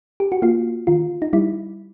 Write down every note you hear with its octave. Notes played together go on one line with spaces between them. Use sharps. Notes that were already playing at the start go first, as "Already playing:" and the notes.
G4
F#4
A#3 F4
D#3 F4
D#4
G3 E4